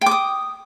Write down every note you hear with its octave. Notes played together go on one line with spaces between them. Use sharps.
G5 D6 D#6